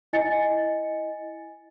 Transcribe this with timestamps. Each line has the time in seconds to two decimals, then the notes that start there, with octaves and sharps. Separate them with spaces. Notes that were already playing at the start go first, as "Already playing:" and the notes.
0.13 E4 D#5 G#5 A6 C#7